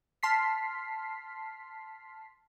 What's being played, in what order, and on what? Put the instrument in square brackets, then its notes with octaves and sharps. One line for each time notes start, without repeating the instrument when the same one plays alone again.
[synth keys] A5 C6 F6 B6 C7